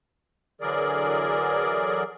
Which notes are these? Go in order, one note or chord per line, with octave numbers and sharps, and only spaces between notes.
D3 E3 F#3 G#4 A#4 D5